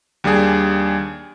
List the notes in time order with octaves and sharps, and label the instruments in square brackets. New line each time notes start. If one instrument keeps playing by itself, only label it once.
[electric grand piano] D#2 G3 D4 G#4 G#5